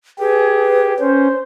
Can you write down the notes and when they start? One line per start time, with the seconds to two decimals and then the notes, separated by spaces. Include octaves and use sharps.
0.19 G4 G#4 B4
1.00 C#4 C5